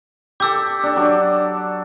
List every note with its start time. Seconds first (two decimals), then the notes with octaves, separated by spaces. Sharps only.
0.40 G4 A4 D6 E6
0.83 D4 A4
0.96 F#3 D4